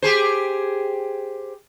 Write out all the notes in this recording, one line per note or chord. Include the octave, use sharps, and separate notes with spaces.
G4 G#4 C5